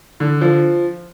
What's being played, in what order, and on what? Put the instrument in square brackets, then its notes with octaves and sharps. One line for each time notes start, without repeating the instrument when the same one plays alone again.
[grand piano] D3
F3